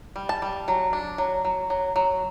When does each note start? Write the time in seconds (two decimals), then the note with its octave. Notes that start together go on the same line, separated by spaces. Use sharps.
0.16 G3
0.29 A5
0.42 G3
0.68 F#3
0.93 D4
1.18 F#3
1.45 F#3
1.70 F#3
1.96 F#3